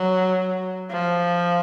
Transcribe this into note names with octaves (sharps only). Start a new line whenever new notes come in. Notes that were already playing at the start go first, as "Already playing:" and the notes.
Already playing: F#3
F3